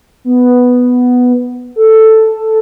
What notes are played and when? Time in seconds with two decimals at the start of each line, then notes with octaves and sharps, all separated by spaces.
0.25 B3
1.76 A4